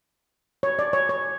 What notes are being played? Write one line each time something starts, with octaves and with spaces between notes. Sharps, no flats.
C#5
D5
C#5
C#5